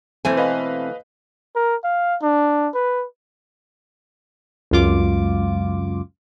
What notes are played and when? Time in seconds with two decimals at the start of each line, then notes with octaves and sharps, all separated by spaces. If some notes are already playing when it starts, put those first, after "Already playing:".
0.25 B2 E3 A3 C4 C5 G#5
0.37 B4 D#5 F5
1.56 A#4
1.84 F5
2.22 D4
2.74 B4
4.71 C#2 F#2 F4 D6